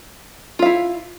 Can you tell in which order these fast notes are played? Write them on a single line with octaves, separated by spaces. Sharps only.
F4 F5 E4